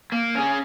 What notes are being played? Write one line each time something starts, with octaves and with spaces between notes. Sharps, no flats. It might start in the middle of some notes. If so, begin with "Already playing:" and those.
A#3
C#4 G#4